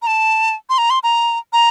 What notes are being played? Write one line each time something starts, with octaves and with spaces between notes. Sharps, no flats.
A#5
A5
C6
A#5
C6
A#5
A#5